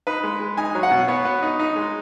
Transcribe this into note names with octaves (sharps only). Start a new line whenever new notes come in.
D#4 B4
G#3
G#3
D#4 G#5
F#3
F#5
B2
B3 C#5
B3
D#4
D#4
G#3